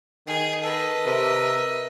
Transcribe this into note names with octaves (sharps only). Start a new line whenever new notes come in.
D#3 G#4
A4 B4 D#5
C3 A#4 E5